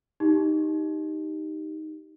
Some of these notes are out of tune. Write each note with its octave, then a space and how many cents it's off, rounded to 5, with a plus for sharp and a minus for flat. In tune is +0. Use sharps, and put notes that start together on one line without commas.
D#4 +0 G4 +0